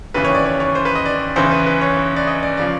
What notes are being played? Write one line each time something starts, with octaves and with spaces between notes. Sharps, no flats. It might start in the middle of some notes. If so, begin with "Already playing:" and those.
D#2 C#3 E3 B4
C#5
D5
C#5
C#5
C5
B4
D#5
D5
E2 C#3 E3 C5
B4
B4
C#5
C#5
D5
D#5
D5
C#3 F3 D5